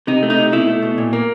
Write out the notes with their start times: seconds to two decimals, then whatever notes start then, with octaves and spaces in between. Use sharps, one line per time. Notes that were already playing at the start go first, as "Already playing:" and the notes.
0.07 C3 D#4
0.23 A3
0.30 D#4
0.37 C3
0.52 B2 E4
0.67 A3
0.83 B2
0.98 A#2
1.13 A#3